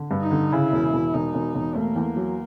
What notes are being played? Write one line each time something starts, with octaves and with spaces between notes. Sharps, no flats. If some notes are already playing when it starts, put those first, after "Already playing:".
Already playing: D3
G2
D#4
D3
C#3 E4
E1
E1
E1 D#4
E1
E1
A3 A#3
E2
F#3